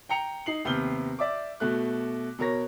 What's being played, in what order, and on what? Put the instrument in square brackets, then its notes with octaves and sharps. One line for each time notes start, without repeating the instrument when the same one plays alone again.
[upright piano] G5 A#5 C#7 F7
D#4 C7 F#7
D#2 C3 B3 F6 G6 G7
D5 E5 D6
B2 A3 F#6
B2 A#4 C#5 A#6